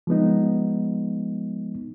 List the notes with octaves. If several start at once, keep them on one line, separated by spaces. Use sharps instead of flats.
F3 G#3 B3 D#4